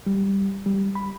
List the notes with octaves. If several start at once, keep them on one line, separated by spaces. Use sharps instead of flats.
G3
G3
B5